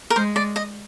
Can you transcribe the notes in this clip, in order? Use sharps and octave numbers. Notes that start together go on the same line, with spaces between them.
A#4
G#3 C5
D5
D#5